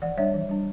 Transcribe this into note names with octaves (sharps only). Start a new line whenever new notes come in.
E3 D5 F#5
G3 D4 C#5 E5
E3
G3 D4